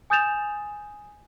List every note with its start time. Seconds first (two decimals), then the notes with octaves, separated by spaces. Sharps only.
0.10 G#5 D#6 G6 A6 E7 F7